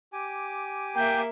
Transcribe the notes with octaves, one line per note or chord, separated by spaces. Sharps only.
G4 G#5 D6
A#3 E5 G5